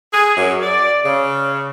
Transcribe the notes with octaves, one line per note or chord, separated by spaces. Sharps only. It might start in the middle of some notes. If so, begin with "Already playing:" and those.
G#4
F#2
D5
C#3